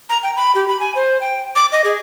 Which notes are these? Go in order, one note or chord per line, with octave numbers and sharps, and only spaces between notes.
A#5
G5
B5
G4
B5
G#5
C5
G5
D6
D#5
G#4